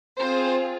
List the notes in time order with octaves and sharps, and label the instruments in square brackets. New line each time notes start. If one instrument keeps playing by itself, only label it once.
[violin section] C4 F4 G#4 C5